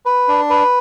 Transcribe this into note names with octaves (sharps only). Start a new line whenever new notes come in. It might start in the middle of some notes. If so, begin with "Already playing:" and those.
B4
D4
B4